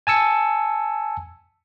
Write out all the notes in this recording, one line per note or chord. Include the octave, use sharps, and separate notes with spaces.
G#5 A5 E6 C#7